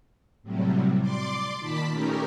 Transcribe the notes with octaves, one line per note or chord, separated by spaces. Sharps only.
A2 C3 F#3 G3
D5 C6 D6
A#2 D#3 A5 B5 B6
A3 C#4 D#4 G4 A#4